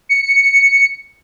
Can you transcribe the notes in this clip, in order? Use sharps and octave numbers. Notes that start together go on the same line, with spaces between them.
C#7